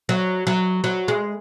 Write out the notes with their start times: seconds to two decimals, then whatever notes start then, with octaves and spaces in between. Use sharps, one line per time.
0.09 F#3
0.47 F#3
0.84 F#3
1.08 G#3